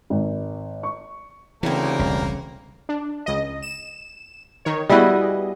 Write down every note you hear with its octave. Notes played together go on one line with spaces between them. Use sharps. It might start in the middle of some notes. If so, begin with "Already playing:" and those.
G#1
C#6
D2 C#3 E3 G3 A#3 C4 A#4
E1 C2
D4
C#2 D#5
E7
D#3 C#5
G3 B3 E4 F#4 G#4 D#5